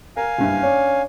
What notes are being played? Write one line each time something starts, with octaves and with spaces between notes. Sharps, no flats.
A#4 F5 G#5
F#1 G2 E5
C#4 D4